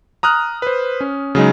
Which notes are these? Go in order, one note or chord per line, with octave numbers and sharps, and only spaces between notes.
A#5 D#6 F6 F#6
B4 C5
C#4
C#3 F#3 G#3 D#4